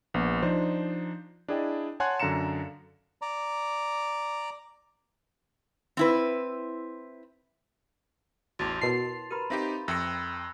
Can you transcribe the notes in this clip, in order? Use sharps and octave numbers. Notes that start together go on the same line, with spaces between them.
A#1 B3
F3 D4 D#4 C5
D4 E4 G#4 D5 D#5 G5
C#5 F#5 G#5 A5 C6 F#6
F#2 D3 F5 A#5 C#7 E7
D5 A#5
C4 E4 B4
A1 E2 F#4 A5 C6 D6 A6 F7
B2 E4 A#4 C#5 A5 C7
G4 A#4 B4 A#5 B5 D#7
C4 D#4 G4 C5 E5 F5
F2 E5 G5 E6 F#6 A#6 C#7